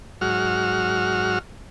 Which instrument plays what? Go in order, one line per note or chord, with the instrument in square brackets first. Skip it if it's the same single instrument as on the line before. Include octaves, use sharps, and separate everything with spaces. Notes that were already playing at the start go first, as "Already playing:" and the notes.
[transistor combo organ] G#2 F#3 F#4 F6